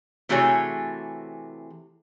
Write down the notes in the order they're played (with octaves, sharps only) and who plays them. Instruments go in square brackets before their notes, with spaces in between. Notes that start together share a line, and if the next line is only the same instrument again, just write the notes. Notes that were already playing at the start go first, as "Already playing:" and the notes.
[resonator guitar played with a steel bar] C3 E3 A3 F#4 G#4 C#5